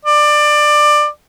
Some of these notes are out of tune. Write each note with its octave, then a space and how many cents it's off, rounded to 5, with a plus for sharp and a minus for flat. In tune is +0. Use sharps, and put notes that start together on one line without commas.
D5 +20